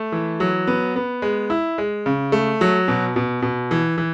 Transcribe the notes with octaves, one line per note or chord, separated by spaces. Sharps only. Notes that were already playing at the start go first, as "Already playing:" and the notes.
Already playing: A3
E3
F#3
B3
B3
G#3
E4
G#3
C#3
A3
F#3
B2
B2
B2
E3
E3